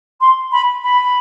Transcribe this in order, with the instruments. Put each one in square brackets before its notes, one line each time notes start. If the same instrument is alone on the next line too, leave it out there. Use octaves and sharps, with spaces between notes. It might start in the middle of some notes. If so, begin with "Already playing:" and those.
[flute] C6
B5
B5